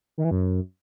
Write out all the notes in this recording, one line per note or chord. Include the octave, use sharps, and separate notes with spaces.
D#3
E3
F#2